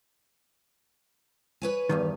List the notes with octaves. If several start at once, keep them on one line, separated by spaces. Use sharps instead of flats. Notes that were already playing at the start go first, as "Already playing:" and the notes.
B4 C#5 G#5
E2 G2 D#3